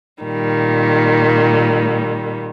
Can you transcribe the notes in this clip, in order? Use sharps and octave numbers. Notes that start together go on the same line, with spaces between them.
A#2 D#3 G3